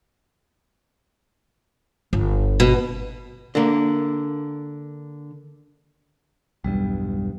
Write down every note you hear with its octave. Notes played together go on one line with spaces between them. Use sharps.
G1
B2
D3 A#3
B1 E2 G2 G3